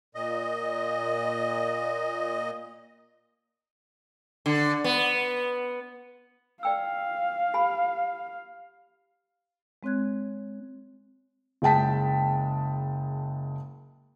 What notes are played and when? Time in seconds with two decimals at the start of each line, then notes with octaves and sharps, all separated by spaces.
0.15 A#2 D#5
4.46 D3
4.84 B3
6.63 D5 F5 G5 E6
7.54 G4 G#5 B5
9.83 G#3 C4 C#5 F#6 G#6
11.62 F#1 G#3 G5 A5 B6